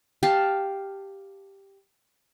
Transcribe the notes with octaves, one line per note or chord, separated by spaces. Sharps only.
G4 F5 A5